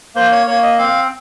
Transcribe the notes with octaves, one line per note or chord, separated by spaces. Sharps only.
A#3 C5
C#5
A#3 C#5
D#5
C4 F5